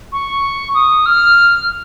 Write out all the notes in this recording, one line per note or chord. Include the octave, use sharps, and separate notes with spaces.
C#6
D#6
F6